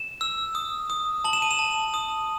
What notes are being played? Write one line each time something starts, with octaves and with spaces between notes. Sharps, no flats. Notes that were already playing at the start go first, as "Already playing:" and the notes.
Already playing: E7
E6
D#6
D#6
A5 F#7
E7
D#7
E7
A5
D#6